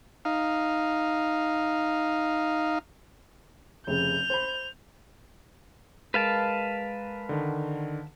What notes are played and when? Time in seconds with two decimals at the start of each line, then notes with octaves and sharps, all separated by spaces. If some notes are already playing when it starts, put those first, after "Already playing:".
0.25 D#4 F5
3.87 F1 C#3 G6 F7
4.30 C5 B5
6.14 G#3 A#4 B4 F5 A5 D7
7.29 D3 D#3